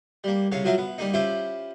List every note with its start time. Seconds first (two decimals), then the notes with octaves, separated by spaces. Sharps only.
0.24 G3 A#3
0.52 C2 C#3 C#5 F5
0.64 F3 F#3 F4 A#4 E5 F5
0.78 B3
0.98 G3 A#3 D#4
1.14 C#4 E4 F4 G4 C5